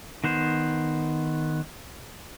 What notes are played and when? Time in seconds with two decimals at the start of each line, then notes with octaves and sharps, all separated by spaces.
0.24 D#3 B3 C5